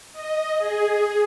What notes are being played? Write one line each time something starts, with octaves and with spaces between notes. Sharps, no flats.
D#5
G#4
G#4